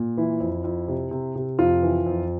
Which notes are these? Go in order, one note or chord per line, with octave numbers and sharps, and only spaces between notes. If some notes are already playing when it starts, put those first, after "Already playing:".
Already playing: A#2
E3 E4
F2
F2
C3
C3
C3
F2 F4
E3
F2